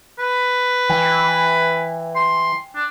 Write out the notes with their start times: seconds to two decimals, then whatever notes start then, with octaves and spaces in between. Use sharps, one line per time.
0.19 B4
0.90 E3 G5 G#5
2.16 C6
2.76 D4